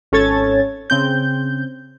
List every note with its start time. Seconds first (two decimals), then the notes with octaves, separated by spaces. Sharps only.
0.12 G#1 C#4 A4 C#5 G#6 A6
0.90 C#3 C4 G6